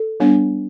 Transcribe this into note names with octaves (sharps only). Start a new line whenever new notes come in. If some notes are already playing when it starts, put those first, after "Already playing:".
Already playing: A4
G3 B3 D4